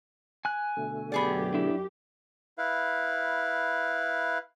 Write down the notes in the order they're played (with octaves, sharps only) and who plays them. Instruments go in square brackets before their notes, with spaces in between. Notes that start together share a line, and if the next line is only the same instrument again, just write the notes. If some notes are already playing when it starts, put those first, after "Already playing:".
[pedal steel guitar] G#5 F#6
[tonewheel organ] B2 D3 A3
[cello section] F#2 G4 [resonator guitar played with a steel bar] B3 G#4 D5
[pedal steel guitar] D4 E4
[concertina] E4 B4 F5